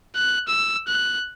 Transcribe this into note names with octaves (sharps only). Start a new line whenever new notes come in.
F#6
E6
F#6